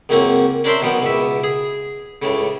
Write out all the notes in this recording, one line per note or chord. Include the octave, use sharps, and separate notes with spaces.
C#2 F#2 A#3 C4 C#4 F#4
C#4 D4 A#4 C5 E5 C6
B2 D#3 F#3 B3
C#2 B2 E5
G#4
C#2 A2 C#3